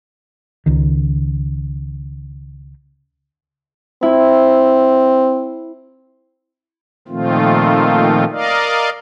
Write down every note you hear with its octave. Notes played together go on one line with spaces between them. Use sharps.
C#2 D#3
C4 E4
A#2 D#3 F3 A3 C4 F4
A#4 D5 D#5 F5